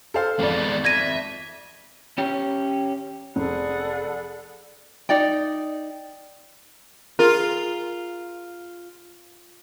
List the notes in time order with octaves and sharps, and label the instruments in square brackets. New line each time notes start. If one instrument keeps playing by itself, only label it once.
[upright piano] A4 C5 F5
[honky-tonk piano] G#1 F2 D5 [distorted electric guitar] G#3 B3
[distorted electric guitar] E5 [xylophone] G#6 A#6 D#7
[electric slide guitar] C#4 G4
[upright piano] F1 [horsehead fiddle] G#4 F#5 [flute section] A4 D5 B5
[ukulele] D#4 D5 G5
[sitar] F4 [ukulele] G#4 A#4